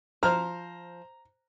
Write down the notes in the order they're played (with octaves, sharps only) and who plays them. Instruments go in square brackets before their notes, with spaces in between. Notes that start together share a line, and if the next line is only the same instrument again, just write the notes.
[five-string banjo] F3 [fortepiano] C5 F6 [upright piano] A#5